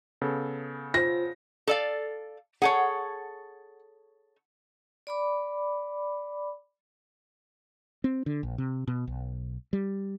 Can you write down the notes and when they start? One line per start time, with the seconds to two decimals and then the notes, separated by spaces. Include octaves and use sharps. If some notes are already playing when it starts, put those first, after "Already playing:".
0.22 C#3 B3 A4
0.94 F4 C5 A#6
1.67 A4 D5 F5
2.62 G#4 A4 C#5 F#5
5.07 D5 B5 D6
8.04 C4
8.26 D3
8.43 A#1
8.58 C3
8.88 B2
9.07 B1
9.73 G3